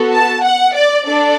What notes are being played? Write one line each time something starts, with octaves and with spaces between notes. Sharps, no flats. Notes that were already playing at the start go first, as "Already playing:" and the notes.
Already playing: B3 F#4 A4
A5
F#5
D5
D4 A4 D5